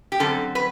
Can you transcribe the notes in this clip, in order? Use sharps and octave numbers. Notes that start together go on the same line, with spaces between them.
G4
F#2 D3 G3 C4 A4
B4